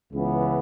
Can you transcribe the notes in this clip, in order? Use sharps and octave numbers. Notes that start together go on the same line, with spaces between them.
C#2 C#3 E3 B3